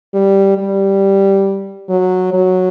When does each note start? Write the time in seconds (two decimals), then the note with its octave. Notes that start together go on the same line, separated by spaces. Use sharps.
0.14 G3
0.57 G3
1.89 F#3
2.33 F#3